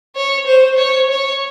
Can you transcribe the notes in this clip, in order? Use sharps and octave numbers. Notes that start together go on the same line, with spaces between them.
C#5
C5
C#5
C#5